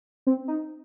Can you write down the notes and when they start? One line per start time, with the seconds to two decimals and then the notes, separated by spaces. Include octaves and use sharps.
0.27 C4
0.48 D#4